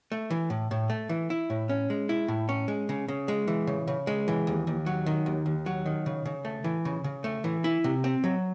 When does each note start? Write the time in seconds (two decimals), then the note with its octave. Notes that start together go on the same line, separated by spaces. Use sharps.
0.12 A3
0.30 E3
0.50 A2
0.71 A2
0.90 A3
1.09 E3
1.30 E4
1.50 A2
1.69 C#4
1.90 G#3
2.09 E4
2.28 A2
2.49 C#4
2.68 G#3
2.89 C#3
3.08 C#3
3.28 G#3
3.48 E3
3.67 C#3
3.88 C#3
4.07 G#3
4.28 E3
4.47 D#2
4.67 D#2
4.86 F#3
5.06 D#3
5.26 D#2
5.46 D#2
5.66 F#3
5.86 D#3
6.06 C#3
6.26 C#3
6.45 A3
6.64 E3
6.85 C#3
7.04 C#3
7.24 A3
7.44 E3
7.64 E4
7.84 C3
8.04 C4
8.24 F#3